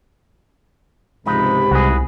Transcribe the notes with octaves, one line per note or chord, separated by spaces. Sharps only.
C#2 G#2 C3 F3 G#3 D#4 B5
C2 F#4 G#4